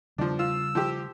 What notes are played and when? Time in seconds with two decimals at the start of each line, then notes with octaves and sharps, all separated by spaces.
0.18 C#3 F3 G3 D4
0.39 F4 E6
0.75 F3 G4